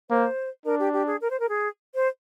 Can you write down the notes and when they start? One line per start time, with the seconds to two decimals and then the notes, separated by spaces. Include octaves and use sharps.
0.10 A#3 C5
0.65 D4 A#4
0.79 G4
0.93 G4
1.07 G#4
1.21 A#4
1.30 C5
1.40 A#4
1.49 G#4
1.95 C5